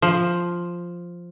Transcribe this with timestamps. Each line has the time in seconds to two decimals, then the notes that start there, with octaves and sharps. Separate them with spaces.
0.02 F3